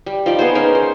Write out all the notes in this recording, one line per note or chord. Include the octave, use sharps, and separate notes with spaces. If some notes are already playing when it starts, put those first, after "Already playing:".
G3
F3 D#4 D5
B3 G#4 C5
C#4 D#4 A#4 C5
C5